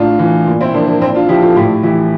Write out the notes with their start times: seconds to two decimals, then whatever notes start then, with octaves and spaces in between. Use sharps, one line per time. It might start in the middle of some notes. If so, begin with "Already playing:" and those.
Already playing: A2 D4 F4
0.19 E3
0.46 A#2
0.60 C4 E4
0.74 F3 A#3 D4
0.87 A#3 D4
1.01 A#2 C4 E4
1.15 D4 F4
1.29 F3 E4 G4
1.42 F4 A4
1.55 A2 E4 G4
1.83 E3 E4 G4